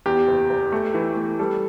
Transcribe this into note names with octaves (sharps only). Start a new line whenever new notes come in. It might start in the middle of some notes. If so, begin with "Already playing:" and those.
E2 G4
F#1
F#1
A3
E3
A3
G3 A4